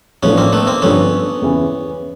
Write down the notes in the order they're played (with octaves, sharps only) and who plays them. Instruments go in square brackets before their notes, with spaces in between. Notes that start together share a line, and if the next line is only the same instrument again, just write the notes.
[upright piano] A1 A2 F3 A3 D4 [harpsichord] B3 C#4
[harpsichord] A#3 C4
A3 B3
A#3 C4
[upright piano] G2 D3 F3 A3 D4 [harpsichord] B3 C#4
[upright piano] E2 C#3 E3